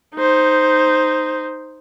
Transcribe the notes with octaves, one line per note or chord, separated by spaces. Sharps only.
D#4 C5